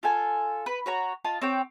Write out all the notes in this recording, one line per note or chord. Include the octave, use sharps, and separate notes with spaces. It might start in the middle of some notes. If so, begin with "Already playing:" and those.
F4 A4 G#5
B4
F#4 C#5 A#5
F4 D#5 A5
C4 C#5 G5